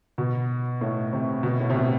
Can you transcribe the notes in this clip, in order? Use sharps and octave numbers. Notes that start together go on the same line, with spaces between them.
B2
A2
C3
B2
A2
C3
B2